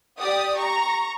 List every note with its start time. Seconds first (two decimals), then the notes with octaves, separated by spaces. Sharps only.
0.19 G4 D5 D#6
0.57 A#5 C#6